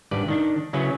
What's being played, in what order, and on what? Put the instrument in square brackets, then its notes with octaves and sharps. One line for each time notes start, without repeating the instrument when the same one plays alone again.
[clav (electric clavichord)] G#1 G2 B4 D5
D#3 D4
C#3 F#3 C#4 E4 B4